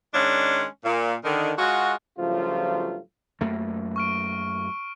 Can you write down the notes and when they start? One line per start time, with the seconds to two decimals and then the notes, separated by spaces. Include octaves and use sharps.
0.13 D#3 G#3 C#4 D4
0.84 A#2
1.24 D3 D#3
1.57 G#3 F4 F#4
2.18 G2 C#3 F3 F#3 A3 F4
3.41 F#2 A3 A#3
3.96 C#6 F6 D7